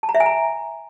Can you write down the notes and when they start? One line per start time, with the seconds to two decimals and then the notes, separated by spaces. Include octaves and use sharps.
0.03 A5
0.09 A#5
0.15 E5
0.20 G#5
0.26 A#5